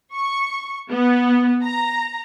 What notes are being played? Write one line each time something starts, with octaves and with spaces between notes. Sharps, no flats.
C#6
B3
A#5